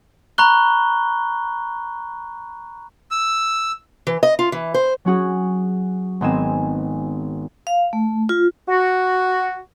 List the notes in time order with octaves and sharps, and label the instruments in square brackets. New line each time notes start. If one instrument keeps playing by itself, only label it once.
[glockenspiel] A#5 B5 C#6 F#6 G7
[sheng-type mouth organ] E6
[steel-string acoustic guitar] E3
D#5
F4
E3
C5
[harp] F#3 C#4 F#4 G#4
G#1 B3 C4 D#5 G#5 E7
[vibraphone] F5
A3
F4
[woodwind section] F#4